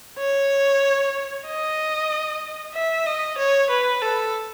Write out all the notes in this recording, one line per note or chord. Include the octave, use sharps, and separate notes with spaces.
C#5
D#5
E5
D#5
C#5
B4
A4